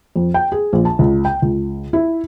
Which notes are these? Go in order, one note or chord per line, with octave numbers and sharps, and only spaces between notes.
F2
G5
G#4
A#1
A5
C#2
G5
C#2
E4